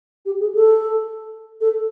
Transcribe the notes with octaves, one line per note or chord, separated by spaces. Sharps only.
G4
G#4
A4
A4